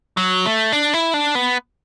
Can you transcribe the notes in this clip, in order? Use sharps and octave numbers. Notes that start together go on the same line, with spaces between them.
F#3
A3
D4
E4
D4
B3